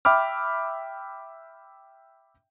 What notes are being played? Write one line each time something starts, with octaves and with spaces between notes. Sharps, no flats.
E5 G5 B5 D6 F6